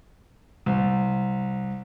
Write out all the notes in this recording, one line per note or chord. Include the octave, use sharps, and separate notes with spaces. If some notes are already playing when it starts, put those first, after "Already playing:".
C2